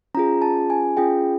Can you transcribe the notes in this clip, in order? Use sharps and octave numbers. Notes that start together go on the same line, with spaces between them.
C#4 F4 G#4 A#5
A5
G#5
C#4 F4 G#4 G5